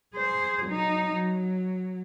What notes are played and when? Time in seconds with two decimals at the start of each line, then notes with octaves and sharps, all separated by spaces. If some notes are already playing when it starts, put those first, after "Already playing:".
0.14 G#4 C5
0.66 F#3 D#4
1.14 F#3